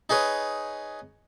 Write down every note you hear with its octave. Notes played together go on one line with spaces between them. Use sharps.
D#4 G#4 B4 C#5